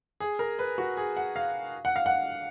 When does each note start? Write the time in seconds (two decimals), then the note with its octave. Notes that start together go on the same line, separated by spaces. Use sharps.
0.20 G#4
0.39 A#4
0.59 B4
0.78 F#4
0.97 G#4
1.17 F#5
1.36 F5
1.85 F#5
1.96 F5
2.06 F#5